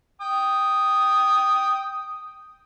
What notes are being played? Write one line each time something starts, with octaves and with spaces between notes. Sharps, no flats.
G5 D#6